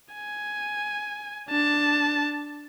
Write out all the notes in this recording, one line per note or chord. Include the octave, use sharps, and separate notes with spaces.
G#5
D4 A5